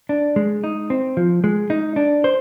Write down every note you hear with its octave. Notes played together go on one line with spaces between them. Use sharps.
D4
G#3
D#4
C4
F3
G#3
D#4
D4
C5